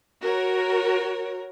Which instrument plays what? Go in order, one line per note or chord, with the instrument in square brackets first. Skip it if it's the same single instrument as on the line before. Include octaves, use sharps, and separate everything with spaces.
[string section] F#4 A#4 C#5